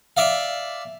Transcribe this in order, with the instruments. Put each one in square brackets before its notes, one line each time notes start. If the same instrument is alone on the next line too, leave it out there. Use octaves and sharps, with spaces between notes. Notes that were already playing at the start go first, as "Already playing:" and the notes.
[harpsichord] D5 E5 F5